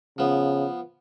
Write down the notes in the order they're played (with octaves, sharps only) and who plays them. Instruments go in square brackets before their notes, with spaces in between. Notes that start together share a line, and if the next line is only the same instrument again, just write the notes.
[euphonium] C#3 [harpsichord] F3 B3